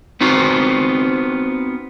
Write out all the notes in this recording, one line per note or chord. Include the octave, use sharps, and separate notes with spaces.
B3 C4 D#4 F4 F#4 C5